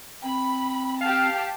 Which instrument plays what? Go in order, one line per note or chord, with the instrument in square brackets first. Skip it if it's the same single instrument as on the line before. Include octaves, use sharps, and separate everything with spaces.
[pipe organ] C4 [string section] B5
[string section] G4 A5 [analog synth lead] F5